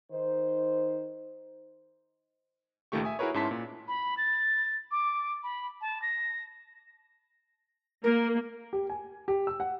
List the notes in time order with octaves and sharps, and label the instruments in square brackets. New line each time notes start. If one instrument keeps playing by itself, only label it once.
[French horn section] D#3 D#4 C5
[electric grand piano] C#2 A#2 D#3 A3 G4 C#6
E5 G#5 D#6
E4 F#4 G#4 A#4 B4 C#5
G#2 C#4 E4 A5 C6 B6
A#2
[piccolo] B5
A6
D6
B5
A5
A#6
[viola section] A#3 [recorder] A#4
[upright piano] G4
G#5
G4
E6
F#5